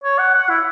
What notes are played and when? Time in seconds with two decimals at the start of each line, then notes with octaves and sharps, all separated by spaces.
0.04 C#5
0.18 F#5
0.34 F#5
0.49 E4